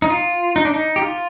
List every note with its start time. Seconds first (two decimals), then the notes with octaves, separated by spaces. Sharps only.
0.02 D#4
0.10 F4
0.56 D#4
0.65 D4
0.74 D#4
0.96 G4
1.02 F4